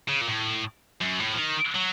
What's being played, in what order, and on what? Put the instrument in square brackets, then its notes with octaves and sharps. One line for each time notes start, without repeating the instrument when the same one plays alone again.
[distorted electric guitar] C#3
A#2
A2
F#2
A2
F3
D#3
F#3